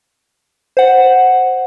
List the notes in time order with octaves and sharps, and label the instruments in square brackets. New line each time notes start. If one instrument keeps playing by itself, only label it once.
[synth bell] C5 F#5